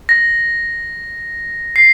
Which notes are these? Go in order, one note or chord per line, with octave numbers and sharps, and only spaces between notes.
A#6
C7